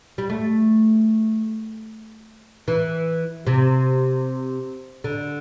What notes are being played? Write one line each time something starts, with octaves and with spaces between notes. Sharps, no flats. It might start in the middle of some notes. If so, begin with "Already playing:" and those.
G3
A3
E3
C3
D3